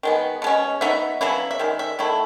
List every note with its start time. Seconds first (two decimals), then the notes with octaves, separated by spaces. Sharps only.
0.03 D#3 G#3 B3
0.42 B2 G#3 C#4
0.81 F#3 B3 D#4 E5
1.21 C#3 F#3 B3 E4
1.51 E5
1.59 D#3 G#3
1.79 E5
1.99 D#3 F#3 A3 E4